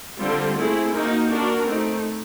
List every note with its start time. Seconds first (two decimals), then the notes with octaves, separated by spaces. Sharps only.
0.21 D3 G3 C4 F4
0.58 A3 C4 E4 G#4
0.94 A#3 D#4 F#4
1.30 A#3 D4 F#4 A#4
1.68 A3 C4 D#4